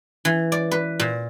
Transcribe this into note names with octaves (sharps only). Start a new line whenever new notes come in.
E3
D5
B4
A#2